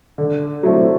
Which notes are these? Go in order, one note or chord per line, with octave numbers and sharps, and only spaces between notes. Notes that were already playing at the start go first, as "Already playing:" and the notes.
D3
F#3 A3 C4 E4